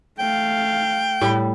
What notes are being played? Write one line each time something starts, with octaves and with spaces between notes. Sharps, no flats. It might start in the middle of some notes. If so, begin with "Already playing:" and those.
A3 F5 G5
A2 G3